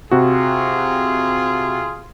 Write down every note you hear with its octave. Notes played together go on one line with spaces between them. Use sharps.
C3 F4 F#4 G#4